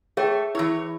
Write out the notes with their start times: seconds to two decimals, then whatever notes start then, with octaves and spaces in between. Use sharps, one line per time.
0.17 A3 G#4 C#5 G5
0.55 E3 E4 C#5 E6